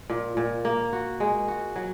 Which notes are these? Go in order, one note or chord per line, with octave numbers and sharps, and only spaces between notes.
A#2
A#2
A#3
F#4
G#3
F#4
F#3